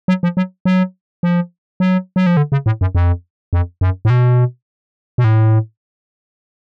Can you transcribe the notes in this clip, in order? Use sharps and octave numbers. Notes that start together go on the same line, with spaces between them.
F#3
F3
F#3
F#3
F3
F#3
F#3
F3
D3
C#3
A2
F#2
F2
F2
F#2
A2
B2
B2
A2